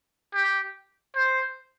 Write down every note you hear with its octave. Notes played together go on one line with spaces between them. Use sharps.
G4
C5